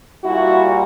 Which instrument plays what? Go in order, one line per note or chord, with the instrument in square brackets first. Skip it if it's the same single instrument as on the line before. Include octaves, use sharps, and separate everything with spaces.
[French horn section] A#2 G3 E4 F#4